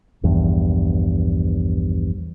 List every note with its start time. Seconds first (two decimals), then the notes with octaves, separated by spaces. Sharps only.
0.23 A#1 E2 G2